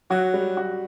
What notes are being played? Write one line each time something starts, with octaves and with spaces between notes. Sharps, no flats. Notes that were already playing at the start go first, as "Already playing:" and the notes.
F#3 F#4
G3
F#4